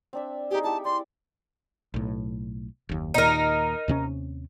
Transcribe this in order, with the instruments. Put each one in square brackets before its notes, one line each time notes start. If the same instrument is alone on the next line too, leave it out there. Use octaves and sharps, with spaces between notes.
[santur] C4 D4 E5
[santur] D#4 G#4 [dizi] G4
[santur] E4 G4 A4 [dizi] A5
[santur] D5 [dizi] C6
[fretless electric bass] B1 A2
F#1 D#2
[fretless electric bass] D#2 A#2 [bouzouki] D#4 A#4
[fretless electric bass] D#2 C3 C#4